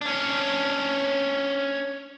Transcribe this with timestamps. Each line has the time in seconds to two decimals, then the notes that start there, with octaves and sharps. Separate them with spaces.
0.01 C#4 D4